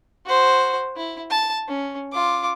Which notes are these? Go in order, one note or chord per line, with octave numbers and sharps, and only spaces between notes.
F#4 C5
E4
A5
C#4
F4 D6